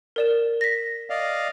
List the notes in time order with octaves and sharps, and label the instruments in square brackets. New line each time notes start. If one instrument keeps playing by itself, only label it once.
[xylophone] A#4 D5 E7
A#6 B6
[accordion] D5 D#5 F5